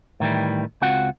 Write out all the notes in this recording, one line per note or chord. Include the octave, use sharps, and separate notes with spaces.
A2 D#3 E3 G3
C#2 C4 F4 F#4 F#5